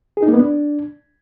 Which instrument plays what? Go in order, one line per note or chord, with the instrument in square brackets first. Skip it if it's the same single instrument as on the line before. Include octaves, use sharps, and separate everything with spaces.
[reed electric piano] G#4
D#4
A#3
B3
D4